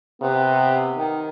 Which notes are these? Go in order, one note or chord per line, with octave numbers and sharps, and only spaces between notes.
C3 B3
D#3